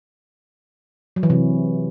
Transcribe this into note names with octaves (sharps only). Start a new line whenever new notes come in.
F#3
E3
C3